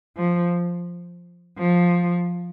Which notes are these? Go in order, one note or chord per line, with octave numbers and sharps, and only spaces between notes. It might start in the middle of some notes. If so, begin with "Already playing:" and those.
F3
F3